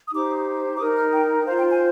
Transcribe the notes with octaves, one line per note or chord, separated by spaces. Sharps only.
D#6
D#4 G4 C5 D6
D6
D#4 A#4 D#6
F6
G5
F4 C5 F5
G5
G#5